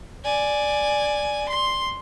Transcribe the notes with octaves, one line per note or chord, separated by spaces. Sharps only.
D5 G#5
C6